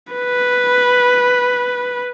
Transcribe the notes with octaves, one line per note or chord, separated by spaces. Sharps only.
B4